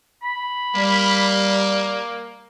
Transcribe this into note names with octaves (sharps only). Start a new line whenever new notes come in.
B5
G3 A#3